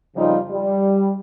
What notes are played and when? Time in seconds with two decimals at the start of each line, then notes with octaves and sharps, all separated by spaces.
0.16 F2 C#3 F3 G3 D#4 F4
0.51 G3